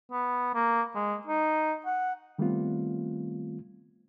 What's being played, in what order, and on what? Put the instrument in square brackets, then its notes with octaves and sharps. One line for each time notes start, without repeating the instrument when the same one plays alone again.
[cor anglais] B3
A#3
G#3
D#4
F#5
[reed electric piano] D#3 G3 A3 B3 C4 F4